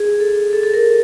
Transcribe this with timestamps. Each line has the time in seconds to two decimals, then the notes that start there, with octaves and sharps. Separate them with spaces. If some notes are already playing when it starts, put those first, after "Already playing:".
Already playing: G#4
0.20 A4
0.53 A4
0.63 A4
0.74 A#4